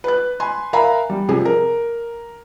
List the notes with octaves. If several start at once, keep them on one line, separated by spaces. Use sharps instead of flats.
B4 F#6
G#5 B5 C6
A#4 E5 F5 G#5 A#5 B5
G3
C3 F3 G#4
A#4